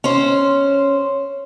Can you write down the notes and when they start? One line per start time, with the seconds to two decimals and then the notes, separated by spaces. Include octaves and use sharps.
0.04 C#4 C5